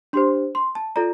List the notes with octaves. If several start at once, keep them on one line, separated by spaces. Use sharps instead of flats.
D4 G4 C5 C6
C6
A5
F4 A4 D5 A#5